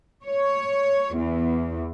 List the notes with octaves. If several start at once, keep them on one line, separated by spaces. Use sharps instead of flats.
C#5
E2